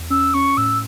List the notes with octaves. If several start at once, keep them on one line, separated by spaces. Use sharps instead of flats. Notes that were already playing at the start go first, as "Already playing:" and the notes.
Already playing: E2
C#4 E6
C#4 C#6
A2 E6